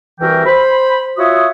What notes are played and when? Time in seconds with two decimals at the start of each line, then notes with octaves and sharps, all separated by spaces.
0.20 C2 E3 F#4 A#4 E5 G5
0.46 C5 B5
1.18 F4 F#4 C#5 E5 D#6